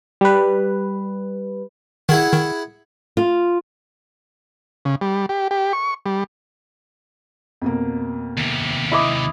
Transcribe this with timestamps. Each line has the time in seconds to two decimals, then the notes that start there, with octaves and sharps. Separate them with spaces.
0.21 G3 B4
2.09 D#3 E4 G#4 F#5
2.32 D#3
3.17 F4
4.85 C#3
5.01 G3
5.29 G4
5.51 G4
5.73 C#6
6.06 G3
7.62 F2 B2 A#3
8.37 D#2 C3
8.92 E4 D#5 D6